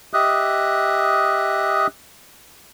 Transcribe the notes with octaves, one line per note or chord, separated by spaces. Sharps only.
G4 D#5 E5 D#6 F#6